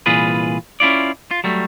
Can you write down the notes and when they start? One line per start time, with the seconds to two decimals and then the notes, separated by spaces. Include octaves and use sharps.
0.06 C2 A#2 E3 F4 G#4 B4
0.80 C#4 E4 F4 D5
1.31 F4
1.44 F#3 G3 A3